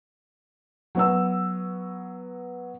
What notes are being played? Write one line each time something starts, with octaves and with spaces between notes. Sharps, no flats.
F#3 B3 E6